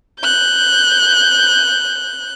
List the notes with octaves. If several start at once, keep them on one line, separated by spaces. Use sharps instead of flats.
F#6 G6